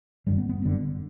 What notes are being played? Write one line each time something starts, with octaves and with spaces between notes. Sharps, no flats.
G1 F#2 D3 G3
B3
B3
G1 F#2 D3